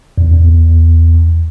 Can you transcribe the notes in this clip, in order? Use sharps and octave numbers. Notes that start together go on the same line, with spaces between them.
E2